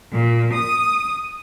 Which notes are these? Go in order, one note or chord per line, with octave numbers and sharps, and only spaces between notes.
A#2
D#6